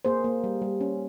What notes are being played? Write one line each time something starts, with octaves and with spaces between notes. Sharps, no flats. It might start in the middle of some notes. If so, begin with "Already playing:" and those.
A#3 G#4 C5
A#3
G3
G3
C#4